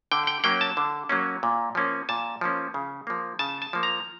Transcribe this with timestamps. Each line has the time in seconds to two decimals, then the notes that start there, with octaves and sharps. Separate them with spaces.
0.12 D3 G5
0.27 G5
0.44 F#3 A#3 C#4 G5
0.61 A5
0.77 D3
1.09 F#3 A#3 C#4
1.43 A#2
1.75 F3 A#3 C#4
2.09 A#2 A5
2.41 F3 A#3 C#4
2.74 C#3
3.07 F3 A#3
3.39 C#3 A5
3.62 A5
3.73 F3 A#3
3.83 A#5